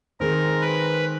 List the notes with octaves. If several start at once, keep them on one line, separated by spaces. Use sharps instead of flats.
D#3 G#3 C4 A#4
B4